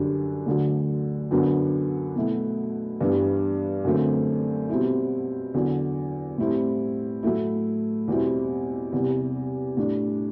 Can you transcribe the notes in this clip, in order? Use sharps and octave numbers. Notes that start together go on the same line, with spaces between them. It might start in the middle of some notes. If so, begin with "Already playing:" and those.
Already playing: F#2 D3 G3 D4
D2 D3 F#3
F#2 D3 F#3 B3 D4
B2 F#3 A3 E4
G2 E3 G3 B3 D4
F#2 D3 F#3 A3 C4
B2 G3 C4 E4
E2 D3 F#3
A2 G3 C4 E4
A2 F#3 A3 E4
E2 B2 G3 C4 E4
E2 C3 G3
A2 G3 D4